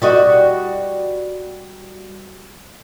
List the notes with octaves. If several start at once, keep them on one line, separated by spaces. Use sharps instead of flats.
G3 F#4 D#5